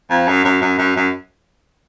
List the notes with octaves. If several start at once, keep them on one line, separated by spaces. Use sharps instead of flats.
F2
F#2
F#2
F#2
F#2
F#2